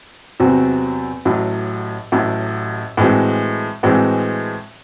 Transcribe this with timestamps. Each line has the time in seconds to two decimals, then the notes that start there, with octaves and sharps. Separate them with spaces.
0.40 E2 C3 F#3 C4 F#4
1.25 A1 A2 F#3
2.12 A1 A2 F#3
2.97 A2 E3 G#3 C4 F#4
3.83 A2 E3 G#3 C4 F#4